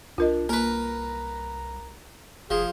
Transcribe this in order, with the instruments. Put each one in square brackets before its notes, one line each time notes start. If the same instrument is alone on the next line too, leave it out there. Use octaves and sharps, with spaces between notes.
[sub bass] C2 [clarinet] D4 [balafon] F4 A#4 D#5
[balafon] A#3 [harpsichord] A#4 B4 [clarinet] A#5
[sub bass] F1 [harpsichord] F3 [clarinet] G#4